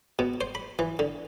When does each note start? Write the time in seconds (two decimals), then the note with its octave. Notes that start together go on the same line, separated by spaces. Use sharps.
0.19 B2
0.41 C5
0.55 B5
0.79 E3
0.99 D3